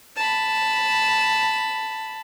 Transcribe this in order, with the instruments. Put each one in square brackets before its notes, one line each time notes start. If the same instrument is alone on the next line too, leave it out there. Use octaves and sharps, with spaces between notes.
[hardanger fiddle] A5 B5